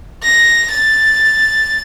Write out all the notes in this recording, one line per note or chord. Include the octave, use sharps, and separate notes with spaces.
A#6
A6